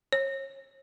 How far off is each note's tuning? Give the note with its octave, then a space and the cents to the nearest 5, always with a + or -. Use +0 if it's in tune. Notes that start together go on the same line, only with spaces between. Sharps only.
C#5 -35